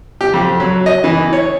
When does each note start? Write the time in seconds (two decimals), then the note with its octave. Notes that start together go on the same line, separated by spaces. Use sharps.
0.21 G4
0.34 F2
0.60 F#3
0.86 D#5
1.04 E3
1.33 C#5